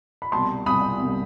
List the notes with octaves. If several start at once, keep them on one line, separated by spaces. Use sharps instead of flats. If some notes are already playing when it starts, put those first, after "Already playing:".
B5
C2 B2 G3 A5 C6
C2 B2 G3 B5 D#6
C2 B2 G3